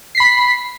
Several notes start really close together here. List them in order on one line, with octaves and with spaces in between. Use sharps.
C7 B6 B5